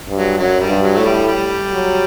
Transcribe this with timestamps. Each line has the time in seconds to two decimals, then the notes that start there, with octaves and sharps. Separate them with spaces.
0.08 G2
0.17 F#3
0.38 F#2 F#3
0.60 G3
0.68 G2
0.82 F#3
0.95 A2 A3
1.05 G3
1.27 G3
1.72 F#3